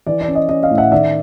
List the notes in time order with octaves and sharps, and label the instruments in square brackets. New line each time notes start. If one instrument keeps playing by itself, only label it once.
[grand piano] E3 D5
D5
C#4
D#5
C#4 D#5
D#5 F5
A2
E5 F#5
D#3 D5 E5